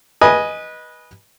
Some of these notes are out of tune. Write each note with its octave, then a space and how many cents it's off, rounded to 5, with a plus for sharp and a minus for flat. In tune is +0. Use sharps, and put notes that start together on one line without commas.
B4 -20 D#5 +0 G#5 +0